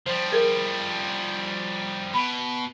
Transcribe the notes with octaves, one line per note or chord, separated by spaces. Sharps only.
F3 G3 C5
G#4 A#4 G#6
B2 B5